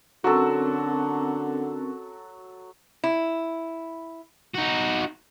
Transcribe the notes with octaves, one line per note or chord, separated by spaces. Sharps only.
D3 F#3 C4 C#4 F#4 A4 A#4
E4
D#4 F#4